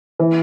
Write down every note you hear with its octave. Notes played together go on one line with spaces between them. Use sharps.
E3